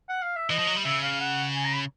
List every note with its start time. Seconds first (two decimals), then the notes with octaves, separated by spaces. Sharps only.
0.09 F#5
0.22 F5
0.36 E5
0.50 E3 D#5
0.59 F3
0.67 F#3
0.77 G3
0.85 C#3 E5
1.03 F5
1.20 F#5
1.56 G#5
1.65 A#5
1.73 B5